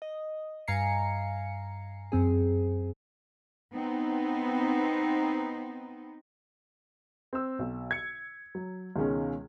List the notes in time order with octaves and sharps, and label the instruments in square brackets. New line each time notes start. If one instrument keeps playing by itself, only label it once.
[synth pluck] D#5
G2 F5 G#5 A#5 C7 C#7
F#2 C4 G#4
[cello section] B3 C4 D#4
[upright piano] C4 E6
B1
G#6 C#7
F#3
C#2 B2 D#3 G#3 C#4